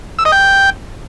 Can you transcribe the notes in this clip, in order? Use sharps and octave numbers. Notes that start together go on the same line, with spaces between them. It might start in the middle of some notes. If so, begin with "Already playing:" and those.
E6
D#5
G5